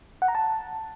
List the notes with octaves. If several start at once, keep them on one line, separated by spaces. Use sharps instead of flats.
F#5
A#5
A5